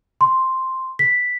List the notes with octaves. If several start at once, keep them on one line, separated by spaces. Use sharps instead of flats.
C6
B6